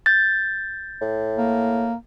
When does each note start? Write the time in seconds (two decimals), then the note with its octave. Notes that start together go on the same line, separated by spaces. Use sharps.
0.06 G6 A6
1.01 A2
1.38 A#3